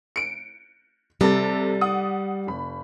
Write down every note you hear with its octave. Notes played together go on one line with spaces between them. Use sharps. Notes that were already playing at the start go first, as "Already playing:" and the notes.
C#7 D7
C3 G3 A4 A6
F#5 D#6
F1 B5